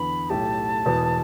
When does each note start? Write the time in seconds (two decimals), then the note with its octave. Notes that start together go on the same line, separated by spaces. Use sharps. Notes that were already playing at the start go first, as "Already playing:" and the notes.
Already playing: E2 D3 B3 B5
0.30 B1 A2 A3 G4 A5
0.85 E1 E2 B2 B3